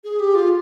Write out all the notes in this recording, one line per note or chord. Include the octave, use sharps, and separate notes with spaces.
G#4
G4
F4